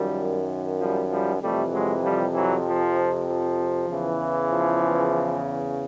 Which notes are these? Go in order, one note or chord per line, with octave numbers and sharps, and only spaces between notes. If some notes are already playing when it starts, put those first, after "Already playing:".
Already playing: F#2 D#3 F3 G3
F3 G3
F3 G3
F2 C3 E3 G3 A3
F#3 G#3
F3 G3
E3 F#3
F3
F3
E2 C#3 E3
F3